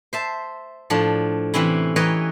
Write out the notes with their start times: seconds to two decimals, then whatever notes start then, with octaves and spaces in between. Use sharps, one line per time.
0.13 C5 E5 A5
0.90 A2 F3 D4
1.54 C3 E3 C4 C#4 E4
1.96 E3 B4 C#5 D#5 G5 A#5